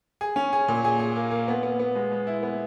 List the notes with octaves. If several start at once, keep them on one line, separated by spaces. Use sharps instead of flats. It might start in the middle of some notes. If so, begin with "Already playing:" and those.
G#4
C#4
G#4
A#2
G#4
G#4
A#3
A#3
B3
B3
B3
G#3
G#3
E4
B3